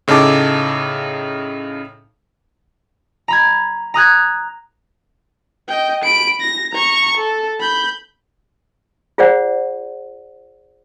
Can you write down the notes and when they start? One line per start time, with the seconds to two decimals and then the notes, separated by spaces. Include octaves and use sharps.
0.08 A2 C#3 D#4 A4 A5 D6
3.28 A#5 B5 G#6
3.94 A#5 D#6 F#6 G#6
5.68 D#5 G5
6.04 B5 D7
6.41 A#6
6.72 A#5 C#6
7.17 A4
7.60 B5 G6
9.18 F4 G#4 C5 D5 F#5